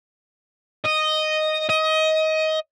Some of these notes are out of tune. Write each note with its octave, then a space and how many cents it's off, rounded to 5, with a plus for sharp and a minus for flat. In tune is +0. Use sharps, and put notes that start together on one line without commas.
D#5 -5
D#5 +20